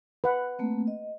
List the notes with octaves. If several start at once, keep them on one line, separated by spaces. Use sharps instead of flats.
B4 F#5
A3 A#3 C4
D#5